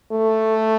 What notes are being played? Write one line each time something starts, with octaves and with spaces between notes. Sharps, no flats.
A3